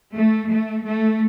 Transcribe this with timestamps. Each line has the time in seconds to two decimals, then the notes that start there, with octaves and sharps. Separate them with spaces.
0.15 A3
0.50 A3
0.86 A3